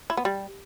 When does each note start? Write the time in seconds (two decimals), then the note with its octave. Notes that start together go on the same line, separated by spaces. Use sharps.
0.10 E4
0.17 B3
0.25 G3